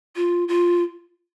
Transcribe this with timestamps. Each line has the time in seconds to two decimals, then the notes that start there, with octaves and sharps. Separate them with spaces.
0.16 F4
0.48 F4